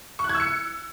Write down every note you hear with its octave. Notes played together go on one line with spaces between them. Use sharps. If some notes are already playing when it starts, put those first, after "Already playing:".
C#6
F#6
G#6
E6
C#7